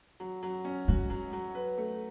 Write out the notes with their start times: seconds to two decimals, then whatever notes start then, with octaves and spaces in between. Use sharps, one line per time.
0.20 F#3
0.43 F#3
0.65 C#4
0.88 G#3 F#4
1.10 F#3
1.33 F#3
1.55 B4
1.78 A3